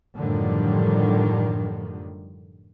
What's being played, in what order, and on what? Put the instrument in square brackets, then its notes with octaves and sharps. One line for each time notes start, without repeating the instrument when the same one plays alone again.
[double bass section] F#2 A2 D3 D#3 F3 G3